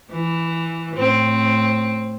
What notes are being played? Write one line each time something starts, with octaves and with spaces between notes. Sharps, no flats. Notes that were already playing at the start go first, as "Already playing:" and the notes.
E3
A2 C4